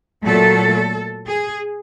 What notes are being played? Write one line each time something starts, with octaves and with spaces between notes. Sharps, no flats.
A#2 F#3 A3 A4
G#4